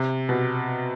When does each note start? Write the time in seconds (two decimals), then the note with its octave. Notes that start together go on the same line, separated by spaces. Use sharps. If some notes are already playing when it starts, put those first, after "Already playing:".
Already playing: C3
0.29 B2